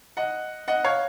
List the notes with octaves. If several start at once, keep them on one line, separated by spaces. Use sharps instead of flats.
D#5 F#5
D#5 F#5
C#5 F5